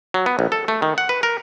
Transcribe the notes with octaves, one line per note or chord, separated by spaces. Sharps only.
F#3
B3
A#1
A4
A3
D#3
F#5
B4
A#4